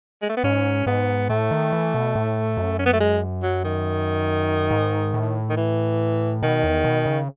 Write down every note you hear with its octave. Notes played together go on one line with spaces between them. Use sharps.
G#3
A3
B3
G#2 C#4
G#2 B3
A2 A3
D#3
E3
B2
A2
F#2
C#4
B3
A3
G#3
F#3
D#3
G#2
A2
D#3
E3
B2 D#3
E2
B2
C#3